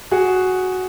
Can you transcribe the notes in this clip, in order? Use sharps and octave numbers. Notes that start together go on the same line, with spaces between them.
F#4 G#4